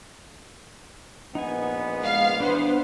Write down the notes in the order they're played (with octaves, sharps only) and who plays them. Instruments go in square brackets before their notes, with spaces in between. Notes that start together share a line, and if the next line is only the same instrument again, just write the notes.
[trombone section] A#1 B3 [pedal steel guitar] D#4 G#5
[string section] G#3 F5
[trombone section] E2 B4 [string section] B3 C5 [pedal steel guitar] D4 F#5